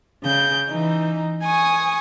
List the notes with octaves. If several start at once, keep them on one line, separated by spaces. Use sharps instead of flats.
C#3 G6
E3 D#4
G#5 C#6 D#6